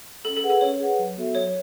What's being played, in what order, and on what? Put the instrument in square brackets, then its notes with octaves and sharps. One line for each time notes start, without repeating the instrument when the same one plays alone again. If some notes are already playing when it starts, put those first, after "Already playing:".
[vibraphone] C#4 [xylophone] A4
[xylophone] A4
[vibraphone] G#4 B4 F#5
[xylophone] A4
[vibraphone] C#4 [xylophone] C#5
[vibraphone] G#4 B4 F#5
F#3
B3 F#4 A4 E5
[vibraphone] F#3 [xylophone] C#5